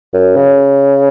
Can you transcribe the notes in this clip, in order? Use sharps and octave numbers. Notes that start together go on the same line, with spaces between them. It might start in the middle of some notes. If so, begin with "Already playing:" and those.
F#2
C#3